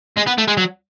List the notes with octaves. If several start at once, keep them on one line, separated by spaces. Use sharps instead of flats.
G#3
B3
A3
G#3
F#3